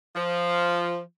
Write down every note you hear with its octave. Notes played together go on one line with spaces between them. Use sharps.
F3